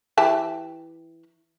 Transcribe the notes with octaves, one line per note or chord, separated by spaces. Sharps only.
E3 G4 A5